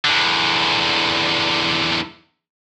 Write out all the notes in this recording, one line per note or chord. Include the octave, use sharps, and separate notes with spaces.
E2 D3